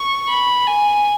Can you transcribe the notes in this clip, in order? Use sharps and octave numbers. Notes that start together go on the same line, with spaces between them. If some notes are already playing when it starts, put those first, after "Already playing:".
Already playing: C#6
B5
G#5